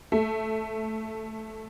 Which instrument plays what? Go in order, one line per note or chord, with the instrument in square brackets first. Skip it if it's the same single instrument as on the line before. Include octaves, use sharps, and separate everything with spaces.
[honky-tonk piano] A3